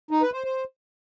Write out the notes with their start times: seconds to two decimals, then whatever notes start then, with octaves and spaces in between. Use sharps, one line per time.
0.11 D#4
0.22 B4
0.33 C5
0.44 C5